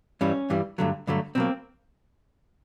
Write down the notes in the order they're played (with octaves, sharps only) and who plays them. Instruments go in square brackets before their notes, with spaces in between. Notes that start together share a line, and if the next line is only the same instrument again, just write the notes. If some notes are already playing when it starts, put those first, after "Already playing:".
[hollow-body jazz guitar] G2 E3 G3 C#4
G2 E3 G3
G2 D3 F#3 A3
G2 D3 F#3 A3
B2 F#3 A#3 C4